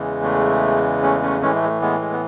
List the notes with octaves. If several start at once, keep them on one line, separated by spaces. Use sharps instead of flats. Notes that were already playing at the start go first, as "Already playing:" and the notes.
Already playing: E2 C#3 E3 G#3
A3
A3 C#4
A3 C#4
A2 E3 G#3 A3 C#4
A3
G#3
A3
G#3 B3
G#3
B3